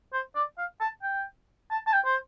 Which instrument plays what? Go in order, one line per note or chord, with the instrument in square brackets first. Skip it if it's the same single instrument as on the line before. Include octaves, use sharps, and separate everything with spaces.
[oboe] C5
D5
F5
A5
G5
A5
A5
G5
C5